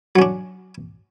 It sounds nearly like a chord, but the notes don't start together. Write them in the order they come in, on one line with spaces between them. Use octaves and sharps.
F#3 C#4 D4